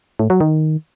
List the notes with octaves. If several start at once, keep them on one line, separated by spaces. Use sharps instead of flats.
A2
F#3
D#3